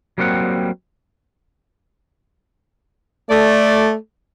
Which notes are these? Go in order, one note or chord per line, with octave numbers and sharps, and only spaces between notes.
F#3 G3 A#3 C4 F#5
A3 D5